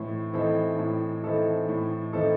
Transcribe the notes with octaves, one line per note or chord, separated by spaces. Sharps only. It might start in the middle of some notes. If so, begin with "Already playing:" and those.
Already playing: A2 E3 C4
E3 C4 D#4 A4
A2
E3 C4 D#4 A4
A2
E3 C4 D#4 A4